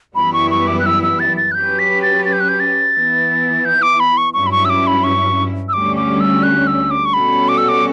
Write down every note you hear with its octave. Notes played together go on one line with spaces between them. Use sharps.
F#2 E3 G3 B3 E4 B5
C#6
C#6
D6
F#6
E6
E6
A6
A6
F#6
F#3 C#4 G4 B4 G6
B6
A6
A6
G6
F#6
G6
A6
E3 B3 E4
G6
D6
B5
C#6
G2 F#3 C#4 E4 C#6
B5
C#6
E6
D6
B5
C#6
E6
D2 D3 G3 C#4 D6
D6
E6
F#6
E6
D6
C#6
B2 G3 C#4 F#4 A4 B5
D6
E6
D6